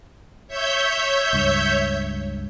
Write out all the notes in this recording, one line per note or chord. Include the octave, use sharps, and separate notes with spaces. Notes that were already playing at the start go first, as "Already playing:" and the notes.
C#5 E5 G6
C#2 G2